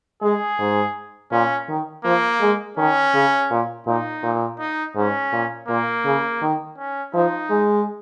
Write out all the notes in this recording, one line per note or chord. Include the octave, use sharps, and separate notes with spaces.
G#3 G#4
G#2
A#2 C#4
D#3
F3 A#3
G#3
D#3 C#4
C#3
A#2
A#2 D#4
A#2
D#4
G#2 C#4
A#2
A#2 A#3
C#3
D#3
C#4
F3 D#4
G#3